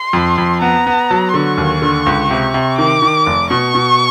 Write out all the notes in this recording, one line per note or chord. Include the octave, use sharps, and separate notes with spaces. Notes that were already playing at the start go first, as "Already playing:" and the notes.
Already playing: C6
F2
F2
B3 A#5
B3
F#3
D3 C#6
D#2
D3
C#2
C3
C3
D#3 D6
D#3
F1
B2 C#6
B2